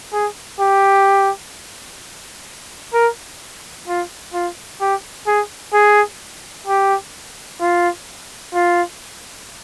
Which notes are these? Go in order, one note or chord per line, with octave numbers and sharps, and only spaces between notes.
G#4
G4
A#4
F4
F4
G4
G#4
G#4
G4
F4
F4